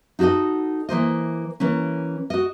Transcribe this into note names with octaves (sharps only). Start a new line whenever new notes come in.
D#4 F#4 G4 A4 D#5
E3 A#3 C5 D#5
E3 A#3 C#4
F#4 D#5